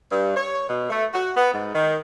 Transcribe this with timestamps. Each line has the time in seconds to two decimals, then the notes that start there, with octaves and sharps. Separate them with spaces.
0.12 G2
0.36 C#5
0.69 B2
0.90 A3
1.14 F#4
1.36 B3
1.53 G#2
1.75 D#3